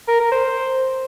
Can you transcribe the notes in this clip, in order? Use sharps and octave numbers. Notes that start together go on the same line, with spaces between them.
A#4
A#4
C5